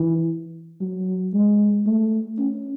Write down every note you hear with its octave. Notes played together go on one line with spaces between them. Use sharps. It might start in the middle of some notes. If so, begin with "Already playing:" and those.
Already playing: E3
F#3
G#3
A3
C#4